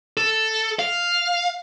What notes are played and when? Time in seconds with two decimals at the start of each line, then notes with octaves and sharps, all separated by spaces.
0.17 A4
0.79 F5